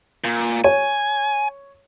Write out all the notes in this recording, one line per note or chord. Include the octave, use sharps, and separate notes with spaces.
A#2
C#5 G#5